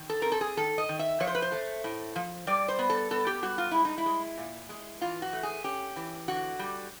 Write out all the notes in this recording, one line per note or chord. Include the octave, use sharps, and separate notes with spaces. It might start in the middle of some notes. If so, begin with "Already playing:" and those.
Already playing: D#3
A4
C4 A#4
A4
G#4
D#3 A4
D#5
D#3
E5
F3 C#5
C5
B4
C5
A3
A2
F3
G3 D5
C5
B3
A4
B3 A4
G4
G3 F#4
F4
G#3 E4
D#4
E4
G#3
A#2
G#3
E3 F4
F#4
A3
G#4
C#4 G4
E3
D3 F#4
G3